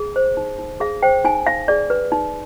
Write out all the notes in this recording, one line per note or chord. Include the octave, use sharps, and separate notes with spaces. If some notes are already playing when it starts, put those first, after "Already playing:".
Already playing: G#4
C5
D#4
D#4
G#4 F5
C5 G5
D#4 G#5
D#4 F5
G#4 D5
B4
D#4